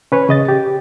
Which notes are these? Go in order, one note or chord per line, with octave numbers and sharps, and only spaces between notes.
C#4 B4 C#5
C#3 D#5 A6
G4